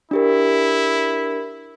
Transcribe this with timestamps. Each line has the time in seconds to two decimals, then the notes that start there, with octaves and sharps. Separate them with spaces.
0.11 D4 E4 G4 A#4